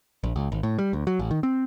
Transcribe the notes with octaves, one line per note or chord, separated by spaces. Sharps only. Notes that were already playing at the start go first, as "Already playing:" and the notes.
A#1
C#2
G#1
A2
G3
D2
F#3
A1
D#3
C4